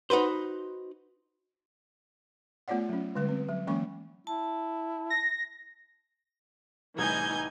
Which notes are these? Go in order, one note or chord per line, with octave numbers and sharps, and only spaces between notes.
D#4 F#4 B4 C5
A3 B3 F4 C#5 D5 F#5
F#3 C#4
D3 G3 G#3 B4
C4
F#3
E3 F#3 G#3 A#3 C#4 C#6
E4 A5
A#6
C2 A2 E3 D#4 G#5 G6 G#6